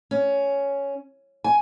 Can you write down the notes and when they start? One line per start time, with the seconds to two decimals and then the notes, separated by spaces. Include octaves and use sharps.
0.11 C#4
1.44 G#5